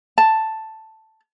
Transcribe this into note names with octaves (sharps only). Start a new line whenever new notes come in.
A5